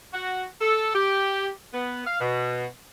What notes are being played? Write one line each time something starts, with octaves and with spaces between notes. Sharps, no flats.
F#4
A4
G4
B3
F5
B2